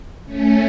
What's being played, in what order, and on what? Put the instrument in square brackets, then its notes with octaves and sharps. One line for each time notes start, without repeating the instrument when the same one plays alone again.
[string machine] A3 C#4